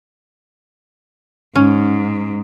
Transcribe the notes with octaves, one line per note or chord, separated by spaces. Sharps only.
G#2 C#4